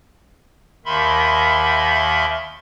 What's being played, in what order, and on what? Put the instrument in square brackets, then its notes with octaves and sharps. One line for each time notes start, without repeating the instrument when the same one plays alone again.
[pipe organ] D#2 D#3 E5 B5 C6